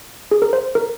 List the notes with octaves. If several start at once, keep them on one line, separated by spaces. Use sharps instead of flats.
G#4
A#4
C5
A#4